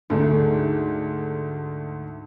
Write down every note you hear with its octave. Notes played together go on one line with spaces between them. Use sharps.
D2 G#2 A3